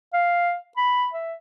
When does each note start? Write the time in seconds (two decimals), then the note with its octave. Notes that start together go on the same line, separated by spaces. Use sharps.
0.13 F5
0.77 B5
1.13 E5